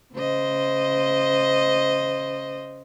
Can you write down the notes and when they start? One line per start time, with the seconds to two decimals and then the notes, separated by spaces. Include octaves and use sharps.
0.15 C#3 C5 D#5